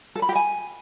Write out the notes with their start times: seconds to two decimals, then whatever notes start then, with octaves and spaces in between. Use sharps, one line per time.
0.15 A4
0.22 B5
0.29 G4
0.35 G#5